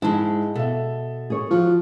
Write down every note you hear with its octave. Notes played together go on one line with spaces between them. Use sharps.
G#2 G#3 E4 A5
B2 A4 E5
G#4 C#5
F3 F#4